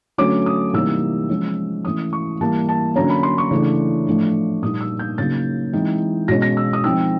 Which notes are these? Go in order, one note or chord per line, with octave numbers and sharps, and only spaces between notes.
D3 F#3 A3 C#4 D6
D#6
C3 E3 G3 A#3 D#4 E6
F3 G#3 C#4
E3 A3 C#4 D#6
C#6
E3 G3 A#3 A5
A5
D3 F#3 A#3 C#4 A#5
B5
C6
C#6
C#3 E3 A3 D4
A2 F3 A3 D4
A#2 G3 A#3 D#4 D#6
E6
G6
C#3 F#3 A#3 D#4 A6
E3 G#3 C4 D#4
B2 G#3 C#4 A#6
A#6
E6
D#6
F3 G#3 C4 D#4 E6